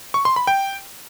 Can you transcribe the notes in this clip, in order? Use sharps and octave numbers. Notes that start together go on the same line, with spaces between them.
C#6
C6
B5
G5